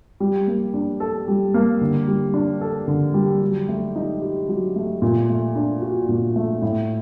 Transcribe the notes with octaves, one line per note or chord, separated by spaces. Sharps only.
G3
A#3
D4
A4
G3
A#3
D3
G3
D4
A4
D3
G3
F#3
A3
D#4
G4
F#3
A3
A#2
A3
D4
F#4
A#2
A3
A2